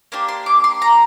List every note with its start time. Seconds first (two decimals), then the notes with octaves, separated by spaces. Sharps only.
0.12 A#3 D4 G4 C6
0.28 C6
0.46 D6
0.64 C6
0.82 A#5